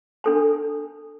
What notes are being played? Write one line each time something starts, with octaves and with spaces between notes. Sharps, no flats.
D4 A4 A5